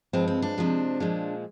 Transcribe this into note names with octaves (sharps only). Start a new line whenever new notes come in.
G2 F3 G#3 C4
C4
D4
C3 F3 G#3
A#2 F3 G#3